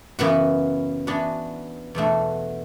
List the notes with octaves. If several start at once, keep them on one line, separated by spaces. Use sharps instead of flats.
F#2 C#3 E3 B3 F#4
E3 B3 D4 F#4
E2 B2 A3 D4 F#4